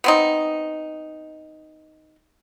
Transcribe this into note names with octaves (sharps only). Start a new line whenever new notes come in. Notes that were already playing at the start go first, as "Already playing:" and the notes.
B3 C4 D#4